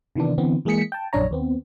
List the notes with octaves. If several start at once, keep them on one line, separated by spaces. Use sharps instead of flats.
C3 D#3 E3 B3 D4
D3 E3 B3 C4
E3 G#3 A#3 G#4 B6 C#7
G5 A5
A#1 F#2 D4 C#5 A#5
D#2 B3 C4